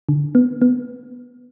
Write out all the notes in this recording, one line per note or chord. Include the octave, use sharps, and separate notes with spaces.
D3
B3
B3